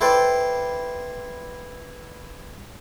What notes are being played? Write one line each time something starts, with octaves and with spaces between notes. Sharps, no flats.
E4 A4 B4 C5 D5 G5